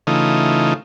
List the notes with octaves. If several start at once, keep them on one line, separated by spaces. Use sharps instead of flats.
C#3 E3 A3 D#4 F4